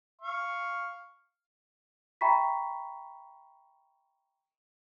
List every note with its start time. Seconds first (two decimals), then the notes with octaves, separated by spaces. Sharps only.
0.22 F5 C#6
2.21 E5 G5 A#5 B5 C#6 B6